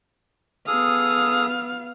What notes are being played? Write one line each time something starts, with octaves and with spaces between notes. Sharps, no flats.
B3 G#4 A4 F5 D#6